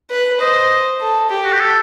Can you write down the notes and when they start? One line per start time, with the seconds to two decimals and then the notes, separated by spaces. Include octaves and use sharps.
0.11 B4
0.40 C5 D#5
1.01 A4
1.30 G4
1.45 F#4
1.53 G4
1.60 A4